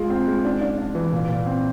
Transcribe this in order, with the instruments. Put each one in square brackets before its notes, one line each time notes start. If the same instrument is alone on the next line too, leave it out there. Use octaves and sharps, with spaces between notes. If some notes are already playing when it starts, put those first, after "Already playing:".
Already playing: [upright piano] G#3 F4
C4
G#3
D4
D4
D4
E3
A#2
A#2
C4